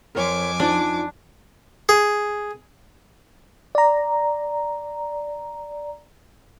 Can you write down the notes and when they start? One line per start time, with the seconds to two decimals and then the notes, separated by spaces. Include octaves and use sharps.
0.15 F2 A#4 C#5 G#5 D6
0.60 D4 D#4 F4 C5 D5
1.89 G#4
3.75 D5 A#5